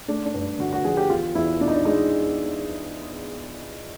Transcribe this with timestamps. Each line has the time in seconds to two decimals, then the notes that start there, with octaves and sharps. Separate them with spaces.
0.08 A3 D4
0.25 D4
0.34 G2
0.59 D3 F#4
0.73 F#4
0.85 F3 G#4
0.97 G4
1.10 E2 F4
1.35 E2 E4
1.60 B2 D4
1.68 D#4
1.75 D4
1.85 G#3 D#4